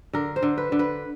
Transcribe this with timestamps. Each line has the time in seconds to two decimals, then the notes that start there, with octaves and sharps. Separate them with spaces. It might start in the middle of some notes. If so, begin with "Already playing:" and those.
0.13 D3 A#4
0.36 C5
0.43 D3
0.58 B4
0.72 D3
0.79 B4